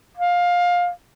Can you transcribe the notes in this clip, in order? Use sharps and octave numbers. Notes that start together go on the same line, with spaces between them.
F5